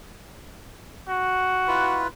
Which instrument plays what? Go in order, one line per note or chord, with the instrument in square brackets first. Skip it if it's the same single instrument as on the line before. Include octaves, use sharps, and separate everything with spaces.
[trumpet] F#4
[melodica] E4 F4 B4